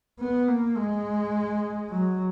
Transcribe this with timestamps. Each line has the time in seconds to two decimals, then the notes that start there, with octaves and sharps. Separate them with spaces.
0.20 B3
0.48 A#3
0.77 G#3
1.91 F#3